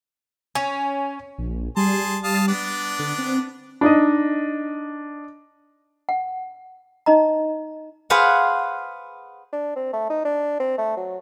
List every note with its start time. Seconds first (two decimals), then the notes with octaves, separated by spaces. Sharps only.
0.55 C#4 G#5
1.38 A#1
1.77 G3 G#4 A5 C6
2.24 F5 A5 D#6
2.48 B3 D4 D5
2.99 D3
3.18 C4
3.81 D4 D#4 D#5
6.09 F#5
7.06 D#4 D#5 A#5
8.10 G#4 B4 C5 F5 F#5
9.53 D4
9.76 C4
9.93 A3
10.10 D#4
10.25 D4
10.60 C4
10.78 A3
10.97 F#3